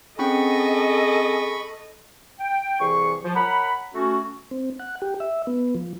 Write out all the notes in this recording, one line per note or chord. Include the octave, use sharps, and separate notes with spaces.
C4 C#4 G#4 A4 D#5 G5 B5 C#6
G5
C2 E3 G#4 C#6
F3
A#4 C#5 F#5 B5
A3 C#4 F#4
C4
F#5
G4
E5
B3
F3